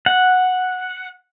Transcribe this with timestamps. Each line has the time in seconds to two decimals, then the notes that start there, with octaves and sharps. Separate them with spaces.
0.06 F#5